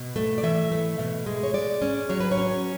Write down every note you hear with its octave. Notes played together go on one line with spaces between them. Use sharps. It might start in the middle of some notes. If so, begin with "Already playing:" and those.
Already playing: B2
A3
D5
E3 E5
A3
B2
G#3
C#5
G#3 D5
C#4
F#3 C#5
B4
C#5
C#4